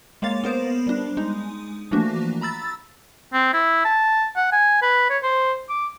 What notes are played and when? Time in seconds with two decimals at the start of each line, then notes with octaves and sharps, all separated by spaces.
0.22 G#3 A#3 C#5 F5 A6
0.44 B3 A#4 C5
0.87 G3 D4
1.17 G#3 D#4
1.91 E3 F3 A3 A#3 D4 F#4
2.41 A#5 B5 E6 A6
3.33 C4
3.54 E4
3.85 A5
4.36 F#5
4.52 G#5
4.82 B4
5.10 C#5
5.23 C5
5.69 D6